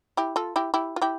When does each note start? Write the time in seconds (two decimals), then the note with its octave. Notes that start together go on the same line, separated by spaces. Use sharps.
0.17 E4 G4
0.36 F4 A4
0.56 E4 G4
0.74 E4 G4
0.96 F4
1.02 E4 G4